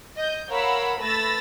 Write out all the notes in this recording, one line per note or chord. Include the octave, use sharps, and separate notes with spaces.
D#5 G6
A#4 C#5 F5 F#5 B5 E6
A3 B4 B5 E6 A6 A#6